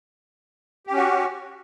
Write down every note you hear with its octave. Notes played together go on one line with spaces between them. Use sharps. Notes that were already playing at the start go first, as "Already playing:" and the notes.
C#4 F#4 G4